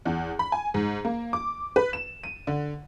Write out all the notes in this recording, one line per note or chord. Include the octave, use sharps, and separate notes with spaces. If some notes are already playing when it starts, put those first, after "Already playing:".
E2
B5
G#5
G#2
A#3
D6
B4
E7
D#7
D3